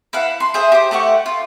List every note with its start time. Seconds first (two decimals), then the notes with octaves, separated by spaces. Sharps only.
0.13 E4 B4 F5 F#5
0.40 C6
0.54 G#4 C5 E5
0.72 G4 C5
0.91 A3 G4 F#5 C#6
1.26 F4